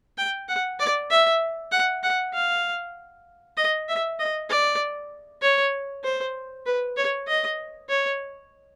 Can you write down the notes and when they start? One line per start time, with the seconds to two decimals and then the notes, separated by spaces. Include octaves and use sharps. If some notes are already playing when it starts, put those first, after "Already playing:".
0.18 G5
0.49 F#5
0.79 D5
1.10 E5
1.72 F#5
2.03 F#5
2.34 F5
3.57 D#5
3.88 E5
4.19 D#5
4.50 D5
5.42 C#5
6.04 C5
6.66 B4
6.97 C#5
7.27 D#5
7.89 C#5